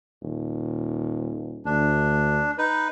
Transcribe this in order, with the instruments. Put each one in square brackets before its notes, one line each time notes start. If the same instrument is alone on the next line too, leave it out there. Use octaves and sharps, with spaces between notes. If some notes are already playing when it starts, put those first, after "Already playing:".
[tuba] D#1
[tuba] D2 [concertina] D4
[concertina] D#4 B4